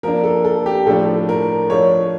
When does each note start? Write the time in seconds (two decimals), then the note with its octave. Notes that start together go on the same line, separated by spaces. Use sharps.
0.03 F3 A#3 D4 A#4
0.24 A4
0.45 A4
0.66 G4
0.87 A2 F3 A3 D4 A4
1.29 A#4
1.70 F3 A3 D4 C#5